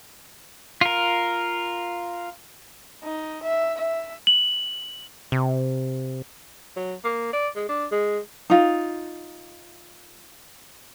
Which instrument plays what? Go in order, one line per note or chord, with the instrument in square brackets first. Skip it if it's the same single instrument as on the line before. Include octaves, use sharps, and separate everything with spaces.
[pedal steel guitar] F4 A#4
[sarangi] D#4
E5
E5
[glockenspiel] F#7
[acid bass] C3
[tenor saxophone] F#3
A#3
D5
G#3
D4
G#3
[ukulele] D#4 F4